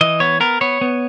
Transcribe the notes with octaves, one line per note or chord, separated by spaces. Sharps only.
E3 D#5
B3 C#5
B3 A#4
B3 C#5
B3